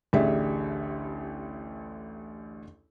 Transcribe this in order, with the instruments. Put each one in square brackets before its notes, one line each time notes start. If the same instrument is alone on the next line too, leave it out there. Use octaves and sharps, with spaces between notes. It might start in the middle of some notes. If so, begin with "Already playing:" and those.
[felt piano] A1 D2 G4 G#4 D5 E5